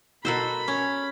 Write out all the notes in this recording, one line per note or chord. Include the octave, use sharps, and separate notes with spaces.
B2 F#4 A4 A#4 C5 B5
C#4